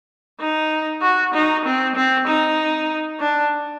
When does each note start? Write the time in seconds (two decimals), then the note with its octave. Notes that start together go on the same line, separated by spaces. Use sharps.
0.40 D#4
1.02 F#4
1.34 D#4
1.65 C4
1.95 C4
2.27 D#4
3.20 D4